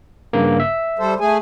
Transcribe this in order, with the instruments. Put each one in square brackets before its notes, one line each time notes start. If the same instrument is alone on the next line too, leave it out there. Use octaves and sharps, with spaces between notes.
[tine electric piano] G2 C#3 A#3
E5
[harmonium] G3 A4 C5
A3 G#4 G#5